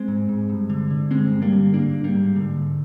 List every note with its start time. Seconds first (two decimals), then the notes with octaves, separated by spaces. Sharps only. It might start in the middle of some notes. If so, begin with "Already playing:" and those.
Already playing: G#3 C4
0.08 G#2
0.29 G#2
0.49 G2
0.70 D3
0.91 D3
1.11 G2 G#3 C4
1.32 G2
1.42 G3 A#3
1.52 D3
1.73 G#2 A#3 D4
1.94 G#2
2.04 G3 A#3
2.14 G#2
2.35 G#2 D3
2.56 G#2